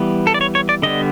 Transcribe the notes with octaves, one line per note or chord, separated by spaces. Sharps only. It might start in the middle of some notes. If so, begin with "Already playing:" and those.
Already playing: E3 G3 B3
A4
D5
C#5
C#5
D5
D3 G3 B3 D#5